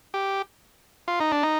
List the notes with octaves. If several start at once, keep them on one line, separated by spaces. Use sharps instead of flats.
G4
F4
D#4
D4
D#4